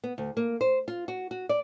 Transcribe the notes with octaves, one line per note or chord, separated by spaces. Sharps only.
B3
D2
A#3
C5
F4
F#4
F#4
D5